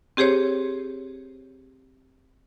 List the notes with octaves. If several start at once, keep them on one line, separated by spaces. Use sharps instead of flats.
C4 G4 G#4 C5 C#5